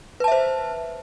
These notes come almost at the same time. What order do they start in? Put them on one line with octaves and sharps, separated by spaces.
B4 A5 E5 C5